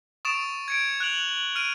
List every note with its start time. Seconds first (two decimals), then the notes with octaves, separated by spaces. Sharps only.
0.25 C#6 D#6 A6 D7 E7
0.68 G#6 C#7 D7
1.00 F#6 D7 F7 F#7
1.29 F#7
1.56 F6 D7 D#7